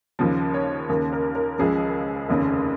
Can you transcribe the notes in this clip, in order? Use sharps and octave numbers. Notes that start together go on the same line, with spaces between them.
D#2 C#3 F3
C#5
D#2 C#3 A#3
A#4
A#4
C#2 C#3 F3 G#4
F1 D#2 C#3